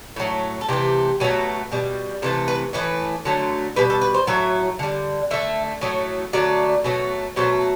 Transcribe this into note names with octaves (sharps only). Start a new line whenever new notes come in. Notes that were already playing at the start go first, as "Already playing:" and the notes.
A2 F#3 A3
A4
C3 E3 A3 G4
B2 F#3 A3
B2 G3
C3 E3 A3 A4
B4
A2 E3 A3 B4
D3 F#3 A3
B2 G3 B4
A4
B4
C5
A2 F#3 A3 E5
D3 G3
D3 A3 E5
A2 F#3 A3
D3 F#3 A3 D5
B2 F#3 A3
B2 F#3 A3 C5